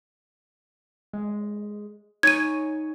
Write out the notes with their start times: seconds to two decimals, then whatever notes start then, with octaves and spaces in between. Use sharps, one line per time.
1.13 G#3
2.23 D#4 C#5 G#5 G#6 D#7